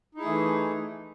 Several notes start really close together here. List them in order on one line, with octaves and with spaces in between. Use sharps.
D#4 E4 G#4 A3 E3